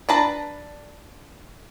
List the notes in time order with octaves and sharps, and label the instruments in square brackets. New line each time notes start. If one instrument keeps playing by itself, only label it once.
[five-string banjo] D4 B4 A5 A#5